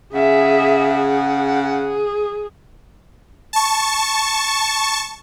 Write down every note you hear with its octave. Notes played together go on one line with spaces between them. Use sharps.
C#3 G#4 E5 F#5
G#4
G#4
A5 C#6